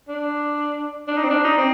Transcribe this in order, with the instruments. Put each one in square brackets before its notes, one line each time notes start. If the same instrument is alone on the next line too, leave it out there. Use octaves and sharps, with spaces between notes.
[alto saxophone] D4
D4
D#4
C4
D4
D#4
C4